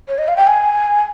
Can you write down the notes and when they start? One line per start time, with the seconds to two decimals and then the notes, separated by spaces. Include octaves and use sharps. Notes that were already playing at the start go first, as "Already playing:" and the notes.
0.08 C#5
0.18 D#5
0.28 F5
0.36 G5
0.47 G#5